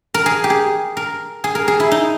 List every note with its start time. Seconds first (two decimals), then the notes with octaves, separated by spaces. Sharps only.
0.14 A#4
0.26 G#4
0.44 G4
0.50 G#4
0.97 A#4
1.44 G#4
1.55 A#4
1.68 G#4
1.80 E4
1.91 D#4